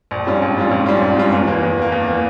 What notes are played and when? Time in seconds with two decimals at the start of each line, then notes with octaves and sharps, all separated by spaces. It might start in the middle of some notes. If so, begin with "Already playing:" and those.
0.11 A#1
0.26 G#2 G3 C#4 F4
0.42 A#1
0.56 G#2 G3 C#4 F4
0.71 A#1
0.86 G#2 G3 C#4 F4
1.01 A#1
1.16 G#2 G3 C#4 F4
1.33 E2
1.48 E3 A#3
1.63 E2
1.78 E3 A#3
1.92 E2
2.08 E3 A#3